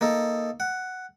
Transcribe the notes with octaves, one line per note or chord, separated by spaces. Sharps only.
A#3 D#4 A4
F#5